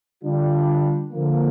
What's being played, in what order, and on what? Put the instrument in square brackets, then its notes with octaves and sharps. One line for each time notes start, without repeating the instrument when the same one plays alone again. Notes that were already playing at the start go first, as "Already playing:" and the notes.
[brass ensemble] D3 G3 D4 F4
D3 F3 A#3